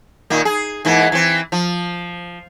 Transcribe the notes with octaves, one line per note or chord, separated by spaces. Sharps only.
A#2 D#3 A#3
G#4
G#2 E3 A#3
E3 C4
F3